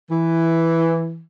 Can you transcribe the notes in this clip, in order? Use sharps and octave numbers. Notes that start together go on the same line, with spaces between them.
E3